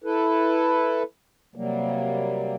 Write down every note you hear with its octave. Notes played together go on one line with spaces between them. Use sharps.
E4 A4 B4
C3 F#3 G3 A#3